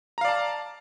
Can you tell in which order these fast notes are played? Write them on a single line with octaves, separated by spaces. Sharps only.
A#5 F5 D5 A5